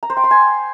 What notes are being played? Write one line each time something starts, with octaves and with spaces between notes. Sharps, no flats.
A#5
C5
G5
C6
G#5